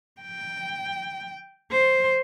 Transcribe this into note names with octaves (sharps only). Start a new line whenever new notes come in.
G5
C5